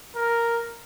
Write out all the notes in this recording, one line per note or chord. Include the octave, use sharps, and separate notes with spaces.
A#4